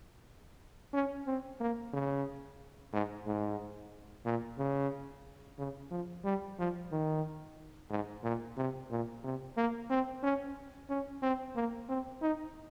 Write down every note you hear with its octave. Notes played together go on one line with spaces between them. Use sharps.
C#4
C4
A#3
C#3
G#2
G#2
A#2
C#3
C#3
F3
G3
F3
D#3
G#2
A#2
C3
A#2
C3
A#3
C4
C#4
C#4
C4
A#3
C4
D#4